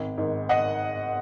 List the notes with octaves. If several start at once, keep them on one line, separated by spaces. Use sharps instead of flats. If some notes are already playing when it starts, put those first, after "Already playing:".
Already playing: G#1
G#2 D#3
D#5 F#5